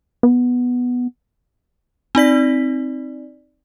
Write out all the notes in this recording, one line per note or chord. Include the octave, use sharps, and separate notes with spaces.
B3
C4 D#4 D5 B6